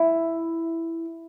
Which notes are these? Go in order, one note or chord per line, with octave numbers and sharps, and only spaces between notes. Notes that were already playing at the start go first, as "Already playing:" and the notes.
Already playing: E4